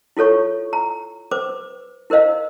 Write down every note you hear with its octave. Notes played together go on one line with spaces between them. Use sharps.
E4 F4 A4 C#5 C#6
A#5
B4 C5 D6
E4 A#4 C5 D#5 F5